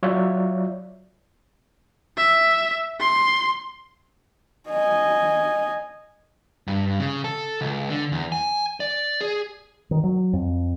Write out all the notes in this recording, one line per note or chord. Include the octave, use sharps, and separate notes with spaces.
F#3 F4 C#5 D5 E5
E5
C6
D#5 G#5
G2
C#3
A4
C#2
D3
E2
G#5
D5
G#4
D#3
F#3
F2